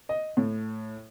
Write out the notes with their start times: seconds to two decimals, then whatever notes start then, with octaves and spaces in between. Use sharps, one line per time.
0.09 D#5
0.37 A2